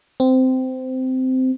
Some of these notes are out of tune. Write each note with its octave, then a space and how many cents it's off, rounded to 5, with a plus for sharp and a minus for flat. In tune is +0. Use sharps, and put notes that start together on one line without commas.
C4 -15